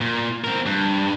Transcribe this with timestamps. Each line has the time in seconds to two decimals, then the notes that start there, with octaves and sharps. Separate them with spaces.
0.01 A#2
0.44 C4 A#4
0.66 G2